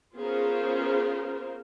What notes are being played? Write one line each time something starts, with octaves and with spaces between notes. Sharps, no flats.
B3 C#4 F4 G#4 A#4 C5